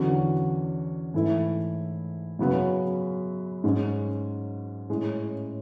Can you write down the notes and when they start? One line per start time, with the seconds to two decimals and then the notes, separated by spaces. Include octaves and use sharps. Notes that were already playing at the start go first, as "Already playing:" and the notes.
Already playing: E2 D3 F#3 C#4 F#4
1.14 G#2 E3 A3 E4
2.39 F#2 C#3 F#3 B3
3.64 G#2 G#3 C#4
4.89 A2 G#3 C#4